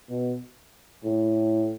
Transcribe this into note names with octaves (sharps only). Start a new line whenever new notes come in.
B2
A2